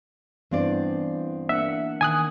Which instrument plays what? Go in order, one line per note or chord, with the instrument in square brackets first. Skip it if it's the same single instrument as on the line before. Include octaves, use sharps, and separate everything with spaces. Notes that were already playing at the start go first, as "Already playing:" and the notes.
[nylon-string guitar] G2 C4 D5 [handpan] E3 B3 D4
[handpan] A#3 D4 F#5 [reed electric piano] E5
[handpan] D#3 [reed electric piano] G#5 D#6 F#6